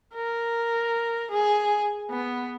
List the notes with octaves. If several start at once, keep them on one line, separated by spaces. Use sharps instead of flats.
A#4
G#4
B3